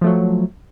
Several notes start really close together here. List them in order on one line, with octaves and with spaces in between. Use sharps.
F3 A3 F#3